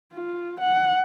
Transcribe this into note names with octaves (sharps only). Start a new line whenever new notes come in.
F4
F#5